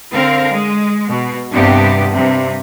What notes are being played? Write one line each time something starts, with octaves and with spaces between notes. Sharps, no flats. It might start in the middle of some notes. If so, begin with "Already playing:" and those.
D3 C4 A#4 F5
G#3
B2
G2 C3 B3 D4 G4
G2 C3